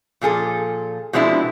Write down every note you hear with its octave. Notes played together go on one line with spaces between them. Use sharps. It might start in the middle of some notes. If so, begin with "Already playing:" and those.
A#2 F3 G#4 A4
B2 F3 G#3 C4 D4 E4